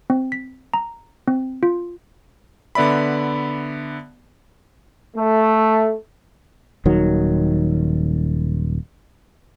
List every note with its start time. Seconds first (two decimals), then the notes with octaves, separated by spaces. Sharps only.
0.10 C4
0.32 B6
0.74 A#5
1.28 C4
1.63 F4
2.75 D3 B3 D5 E5 B5
5.15 A3
6.85 D#1 D#3 F#3